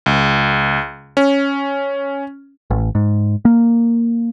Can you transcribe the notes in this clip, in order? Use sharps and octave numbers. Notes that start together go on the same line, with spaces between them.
C#2
C#4
A1
G#2
A#3